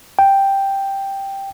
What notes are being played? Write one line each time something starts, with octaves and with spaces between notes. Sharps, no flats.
G5